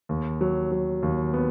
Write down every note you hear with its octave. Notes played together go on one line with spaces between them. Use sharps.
D#2
F#3
F#3
D#2
B3